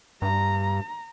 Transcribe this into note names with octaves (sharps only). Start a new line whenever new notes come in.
G2 A#5